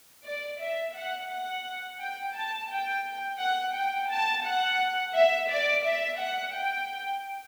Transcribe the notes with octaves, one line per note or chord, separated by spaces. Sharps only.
D5
E5
F#5
F#5
G5
A5
G5
F#5
G5
A5
F#5
E5
D5
E5
F#5
G5